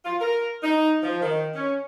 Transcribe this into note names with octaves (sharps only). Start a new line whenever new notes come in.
F4
A#4
D#4
F3
D#3
C#4